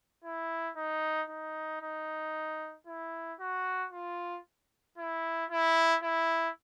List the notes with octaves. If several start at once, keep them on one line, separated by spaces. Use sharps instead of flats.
E4
D#4
D#4
D#4
E4
F#4
F4
E4
E4
E4